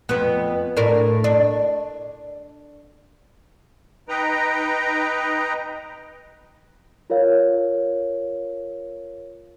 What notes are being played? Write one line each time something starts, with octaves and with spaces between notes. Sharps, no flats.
F2 B3
A2 D4 A#4
D4
D#4 B4 D#5 G5 A#5
F4 A#4 C#5 F5